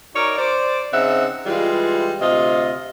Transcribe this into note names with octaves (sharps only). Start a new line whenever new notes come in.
D#4 F#4 A#4 C#5 D5
C5 D5
C#3 C4 D#4 E5 F#5
E3 G3 G#3 F4
D2 C3 F4 D#5